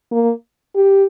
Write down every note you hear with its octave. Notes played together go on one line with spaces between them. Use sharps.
A#3
G4